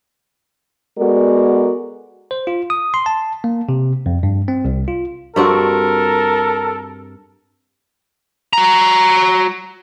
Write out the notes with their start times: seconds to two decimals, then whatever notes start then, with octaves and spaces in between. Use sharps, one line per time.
0.99 G#3 B3 F#4 A4 A#4 D5
2.31 C5
2.47 F4
2.70 D#6
2.94 C6
3.06 A5
3.44 A#3
3.69 C3
4.06 F2
4.23 G2
4.48 C4
4.65 C2
4.88 F4
5.36 G2 C4 F#4 A4 A#4
8.53 F#4 A#5